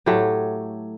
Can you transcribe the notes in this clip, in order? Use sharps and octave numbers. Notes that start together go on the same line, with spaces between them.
A2 F#3 A3 G4